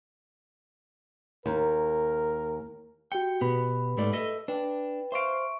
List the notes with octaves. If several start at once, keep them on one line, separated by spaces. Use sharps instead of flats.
D#2 A#4
F#4 G4 G5 C#7
B2 B3 G4 B4 B5
G#2 A3 D5
A4 D#5 E5
D4 B4 G5
C5 E5 F5 C#6 D7